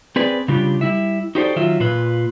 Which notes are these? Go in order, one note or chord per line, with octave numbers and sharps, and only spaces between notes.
C4 G#4 B4 D5
C#3 G3 D4 F4 G4
G3 E4 E5
D#4 F#4 G4 A4 C5 D5
D#3 F#3 F4 E5
A#2 F4 B4